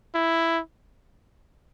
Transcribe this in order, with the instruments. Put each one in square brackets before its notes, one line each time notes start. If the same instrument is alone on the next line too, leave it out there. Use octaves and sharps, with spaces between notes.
[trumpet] E4